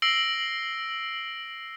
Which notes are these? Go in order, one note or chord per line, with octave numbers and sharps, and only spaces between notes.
E6 A#6 C7 D7 F#7 G7